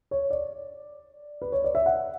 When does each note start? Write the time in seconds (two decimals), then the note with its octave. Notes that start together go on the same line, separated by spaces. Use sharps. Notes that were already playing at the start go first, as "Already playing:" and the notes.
0.11 C#5
0.30 D5
1.42 B4
1.52 C#5
1.64 D5
1.75 E5
1.86 F#5